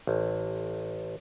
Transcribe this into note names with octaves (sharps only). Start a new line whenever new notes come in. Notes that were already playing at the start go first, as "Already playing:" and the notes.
A1